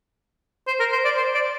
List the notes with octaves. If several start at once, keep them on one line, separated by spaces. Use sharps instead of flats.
C5
A#4
C5
D5
C5
D5